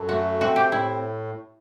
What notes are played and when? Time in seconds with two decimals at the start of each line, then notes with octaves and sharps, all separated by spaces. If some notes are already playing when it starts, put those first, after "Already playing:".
Already playing: F#2 A4
0.09 A3 F#4
0.41 C4 F#4
0.56 G4
0.72 A2 E4